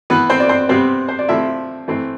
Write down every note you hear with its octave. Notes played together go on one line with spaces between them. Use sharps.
E3 B3 B4
C4 C5
D5
C4 C5
C3 G3 B3 C4 C5
C5
D5
C3 F3 A3 C4 E4 E5
E3 A3 C4